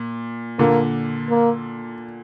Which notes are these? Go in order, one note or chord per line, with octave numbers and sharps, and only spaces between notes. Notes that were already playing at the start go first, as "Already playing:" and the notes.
Already playing: A#2
A#2 D3 A#3
A#3